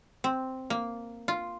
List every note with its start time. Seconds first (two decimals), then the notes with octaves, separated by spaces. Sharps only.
0.24 C4
0.70 A#3
1.28 F4